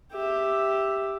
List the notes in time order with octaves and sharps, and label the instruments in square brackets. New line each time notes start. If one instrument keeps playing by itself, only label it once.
[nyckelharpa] G4 E5